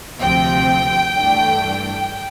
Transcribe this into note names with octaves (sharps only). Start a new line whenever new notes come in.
D2 C3 F3 C4 G5
G2 E3 A3 D4